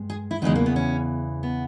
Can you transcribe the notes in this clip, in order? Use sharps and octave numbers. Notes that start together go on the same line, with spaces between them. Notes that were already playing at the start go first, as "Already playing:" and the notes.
Already playing: G2 G#3
G#4
E4
E2 C#3 E3 G#3 D#4
A#3
B3
C#4
B3